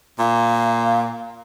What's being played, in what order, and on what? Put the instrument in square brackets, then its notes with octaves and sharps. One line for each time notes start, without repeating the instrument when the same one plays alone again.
[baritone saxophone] A#2 [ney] F5